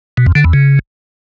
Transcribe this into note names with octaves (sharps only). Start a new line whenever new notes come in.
B2
F2
D3
E2
C#3